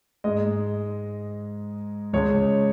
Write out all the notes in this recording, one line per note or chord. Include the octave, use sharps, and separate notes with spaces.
G#2 G#3 D#5
C#2 C#3 G#3 C#5